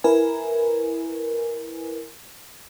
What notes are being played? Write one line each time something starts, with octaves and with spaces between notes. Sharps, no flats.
E4 A#4 B4 G#5